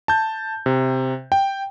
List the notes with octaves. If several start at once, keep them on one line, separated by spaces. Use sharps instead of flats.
A5 G6
C3
G5